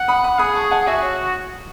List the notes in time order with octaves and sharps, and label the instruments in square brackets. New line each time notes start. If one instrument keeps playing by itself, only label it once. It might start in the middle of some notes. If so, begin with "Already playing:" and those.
Already playing: [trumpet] F#5
[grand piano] B5 D#6
B5 D#6
[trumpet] G#4 [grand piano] B5 D#6
[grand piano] A5 C#6
F#5 A5
[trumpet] F#4 [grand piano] E5 G#5
[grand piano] C#5